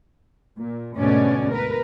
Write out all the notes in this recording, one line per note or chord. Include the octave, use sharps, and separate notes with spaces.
A#2
D2 G#2 B2 A3 C#4 D5
A#4 B4